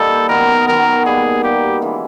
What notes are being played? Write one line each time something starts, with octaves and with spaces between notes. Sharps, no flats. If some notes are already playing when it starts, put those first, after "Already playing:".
Already playing: G3 A#3 D#4 A4
D#3 F#3 B3 A#4
D#3 F#3 B3 A#4
B2 G3 A#3 G#4
B2 G3 A#3 G4
C#3 E3 G#3